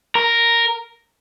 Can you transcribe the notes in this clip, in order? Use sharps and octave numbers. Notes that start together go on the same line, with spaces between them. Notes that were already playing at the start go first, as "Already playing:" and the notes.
A#4